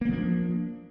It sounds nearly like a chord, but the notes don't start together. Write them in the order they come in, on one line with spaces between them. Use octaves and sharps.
A#3 C4 F3 D4